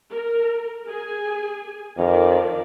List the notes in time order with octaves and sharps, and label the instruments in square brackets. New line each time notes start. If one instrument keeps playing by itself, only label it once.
[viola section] A#4
G#4 G#5
[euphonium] F2 [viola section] D#3 A#4 D5